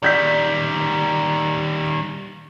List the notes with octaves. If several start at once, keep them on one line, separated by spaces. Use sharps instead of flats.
D#3 G3 D5 G6 B6